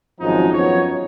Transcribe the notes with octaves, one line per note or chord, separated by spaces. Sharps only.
G#1 F#2 F3 G#3 D#4
F#2 F3 B3 C#5